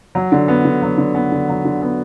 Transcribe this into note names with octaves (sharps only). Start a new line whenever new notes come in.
F#3
D3
B3
D3
F#3
D3
B3
D3
F#3
D3
B3